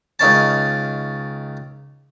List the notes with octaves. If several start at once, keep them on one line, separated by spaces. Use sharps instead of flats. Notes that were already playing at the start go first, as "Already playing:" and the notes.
C#2 D#3 C#4 A5